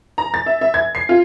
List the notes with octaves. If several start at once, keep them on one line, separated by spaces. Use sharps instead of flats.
A#5
A6
E5
E5
G#6
C7
F4